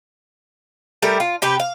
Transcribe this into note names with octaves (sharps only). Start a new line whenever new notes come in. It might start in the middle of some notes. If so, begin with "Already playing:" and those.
G3 A3 G4 A#4
F4
C3 G4 B4
F5